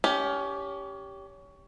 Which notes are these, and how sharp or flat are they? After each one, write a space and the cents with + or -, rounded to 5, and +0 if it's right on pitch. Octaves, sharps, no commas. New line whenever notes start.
C#4 +25 G4 +0